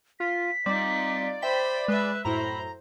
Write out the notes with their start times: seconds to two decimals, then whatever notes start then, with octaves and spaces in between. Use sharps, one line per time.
0.20 F4 B6
0.66 G3 C4 D#4 F4 D5
1.42 C5 E5 G5 B5 B6
1.88 G#3 B4 E5 B5 F#6
2.25 F#2 A2 E4 C5 A#5 B5